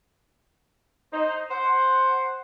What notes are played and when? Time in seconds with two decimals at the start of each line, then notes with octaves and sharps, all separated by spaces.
1.12 D#4 C5
1.50 C5 F#5